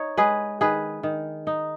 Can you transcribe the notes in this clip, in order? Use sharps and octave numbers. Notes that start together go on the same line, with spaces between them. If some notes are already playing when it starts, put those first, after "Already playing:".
Already playing: D#4 C#5
G#3 G#4 B4
D#3 G#4 B4
D#3
D#4